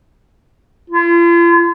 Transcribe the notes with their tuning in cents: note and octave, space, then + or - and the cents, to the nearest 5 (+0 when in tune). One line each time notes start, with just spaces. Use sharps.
F4 -45